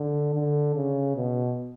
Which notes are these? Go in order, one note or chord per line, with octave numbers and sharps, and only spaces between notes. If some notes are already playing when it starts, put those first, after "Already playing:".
Already playing: D3
D3
C#3
B2